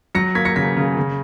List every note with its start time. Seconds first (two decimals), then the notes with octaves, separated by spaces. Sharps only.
0.15 F#3 A#6 C#7
0.35 A#3 G#6 B6
0.45 A#6 C#7
0.55 C#3 G#6 B6
0.77 C#3
0.97 C#3